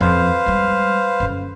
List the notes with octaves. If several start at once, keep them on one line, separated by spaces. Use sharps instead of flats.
F2 B4 C5 F5
G3 G#3
F#2 D3